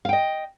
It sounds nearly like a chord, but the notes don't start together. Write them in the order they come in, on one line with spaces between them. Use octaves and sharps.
F5 G5 D#5